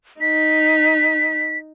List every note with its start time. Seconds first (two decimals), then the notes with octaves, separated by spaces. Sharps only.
0.21 D#4 B6